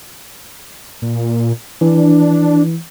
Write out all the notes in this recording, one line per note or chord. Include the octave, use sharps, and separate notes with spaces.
A#2
E3 D4